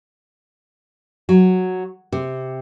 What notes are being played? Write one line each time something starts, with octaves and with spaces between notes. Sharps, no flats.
F#3
C3